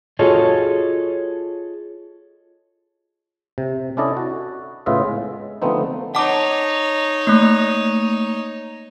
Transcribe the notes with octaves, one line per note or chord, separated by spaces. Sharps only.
F4 F#4 G#4 A4 C#5 D#5
C3
C#4 D4 E4 A4 D5 D#5
F#4
A2 C#3 B3 F4 D#5 E5
G#3
D3 F3 A3 B3 C4 D#4
D#4 C#5 F#5 A5 D6
A3 A#3